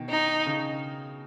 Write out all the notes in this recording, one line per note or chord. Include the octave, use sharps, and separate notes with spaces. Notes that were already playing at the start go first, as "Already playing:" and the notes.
Already playing: B2 D#3
D#4
C#3